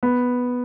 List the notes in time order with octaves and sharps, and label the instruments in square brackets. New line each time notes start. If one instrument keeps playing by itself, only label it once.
[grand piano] B3